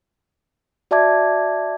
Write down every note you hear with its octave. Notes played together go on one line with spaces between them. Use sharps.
F#4 D5 E5 A5 D6 G#6